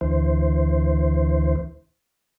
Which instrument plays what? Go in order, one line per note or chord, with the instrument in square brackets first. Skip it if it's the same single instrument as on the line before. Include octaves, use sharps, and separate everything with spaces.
[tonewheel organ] D2 E3 C5